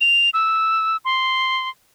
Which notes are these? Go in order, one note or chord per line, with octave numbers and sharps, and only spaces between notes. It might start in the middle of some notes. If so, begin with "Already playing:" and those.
F7
E6
C6